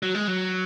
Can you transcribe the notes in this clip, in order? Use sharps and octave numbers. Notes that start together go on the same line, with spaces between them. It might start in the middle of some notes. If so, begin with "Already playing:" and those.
F#3
G#3
F#3